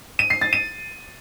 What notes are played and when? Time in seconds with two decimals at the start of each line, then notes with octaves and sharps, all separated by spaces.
0.19 D#7
0.30 C7
0.41 A6
0.53 D#7